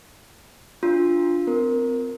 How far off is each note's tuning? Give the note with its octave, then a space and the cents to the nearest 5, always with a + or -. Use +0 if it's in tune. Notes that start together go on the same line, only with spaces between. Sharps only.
D4 +0 F4 +0 C6 +0
C4 -25 A#4 +0